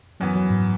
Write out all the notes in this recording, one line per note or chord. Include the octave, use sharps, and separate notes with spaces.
F#2 E3 F#3 B3
F#3
G#2